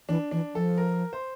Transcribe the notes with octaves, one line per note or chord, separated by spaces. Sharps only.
E3 D4
E3 D4
F3 A4
A#4
C5